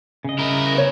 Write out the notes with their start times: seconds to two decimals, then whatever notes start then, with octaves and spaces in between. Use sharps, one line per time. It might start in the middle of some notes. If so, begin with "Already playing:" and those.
0.24 C#3 D#5
0.39 E4 A#4
0.75 B3 C#5